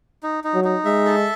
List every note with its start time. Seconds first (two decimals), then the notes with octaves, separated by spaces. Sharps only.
0.23 D#4
0.44 D#4
0.54 F#3
0.64 D#4
0.85 G#3 E5
1.06 A4